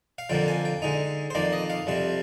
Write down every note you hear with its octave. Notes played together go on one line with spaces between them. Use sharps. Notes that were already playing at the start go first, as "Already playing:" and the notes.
F5
F2 D3 F3 A#3 G5
G#5
G5
D3 G#3 D#4
C5
F2 D#3 A#3 D5
D#5
F5
F2 C3 G3 C4